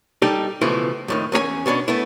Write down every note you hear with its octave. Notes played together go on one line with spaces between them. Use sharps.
G3 D#4 G4 A4
C#2 B2 E3 F3 A3 E4
F2 A2 D#3
E2 C#4 G#4 G#5
B2 B3 C#4 D4
A3 B3 E4